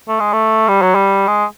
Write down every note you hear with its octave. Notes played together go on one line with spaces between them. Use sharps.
A3
G#3
A3
G3
F#3
G3
G#3